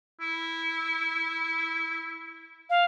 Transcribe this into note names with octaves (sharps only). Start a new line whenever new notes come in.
E4
F5